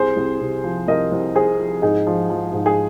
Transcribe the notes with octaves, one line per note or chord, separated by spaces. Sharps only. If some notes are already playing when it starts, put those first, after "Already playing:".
Already playing: C2 G#4 C5
C2
C3
F3
C2 A#4 D#5
C2
C3 G#4 C5
F3
G#2 D#4 G#4
F3
F3
G#2
G#4